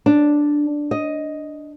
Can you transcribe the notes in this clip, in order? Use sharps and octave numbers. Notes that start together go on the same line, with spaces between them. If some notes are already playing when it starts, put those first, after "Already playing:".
D4
D#5